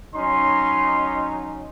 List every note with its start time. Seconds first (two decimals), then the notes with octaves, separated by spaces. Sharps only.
0.15 F#3 C#4 D#4 C6